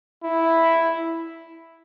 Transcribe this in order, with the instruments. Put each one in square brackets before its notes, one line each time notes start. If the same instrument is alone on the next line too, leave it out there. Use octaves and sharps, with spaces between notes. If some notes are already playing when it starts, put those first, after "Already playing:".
[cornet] E4